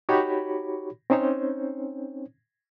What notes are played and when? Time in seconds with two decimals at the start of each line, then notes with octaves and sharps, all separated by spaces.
0.09 D#4 F#4 G4 C#5 B5
1.10 C4 C#4 D#4 C5 C#5